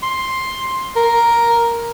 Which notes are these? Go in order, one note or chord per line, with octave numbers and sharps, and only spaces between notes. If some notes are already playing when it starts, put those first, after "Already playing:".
C6
A#4